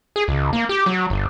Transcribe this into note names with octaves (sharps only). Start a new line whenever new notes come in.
G#4
C#2
A#3
G4
F#3
G1